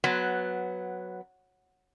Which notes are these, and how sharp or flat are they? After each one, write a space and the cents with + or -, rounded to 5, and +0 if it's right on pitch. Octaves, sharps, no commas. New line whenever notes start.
F#3 -5 B3 +0